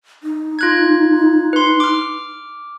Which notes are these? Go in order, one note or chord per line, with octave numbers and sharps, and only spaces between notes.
D#4
F4 F#6 G#6
B4 C6
D6 F6